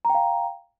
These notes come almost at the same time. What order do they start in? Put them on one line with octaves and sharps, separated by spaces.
A#5 G5 F5